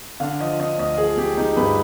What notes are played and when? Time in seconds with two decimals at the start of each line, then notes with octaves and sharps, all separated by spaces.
0.20 D3 F5
0.40 F3 D#5
0.60 D3 D#5
0.78 D2 D#5
0.98 F3 G#4
1.17 G#3 G4
1.37 G#3 D#4
1.57 G2 B4